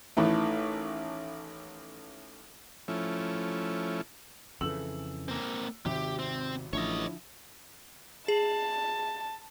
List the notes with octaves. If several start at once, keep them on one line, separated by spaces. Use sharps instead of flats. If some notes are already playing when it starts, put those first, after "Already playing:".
A1 D#3 E3 A3
F3 A3 C#4 E4
F2 C#3 E3 A4 E6 F#7
A#3 C4
G#1 D#2 C3 G4 E5
C4
A1 D3 F3 E4 C#5 D#5
G#4 A5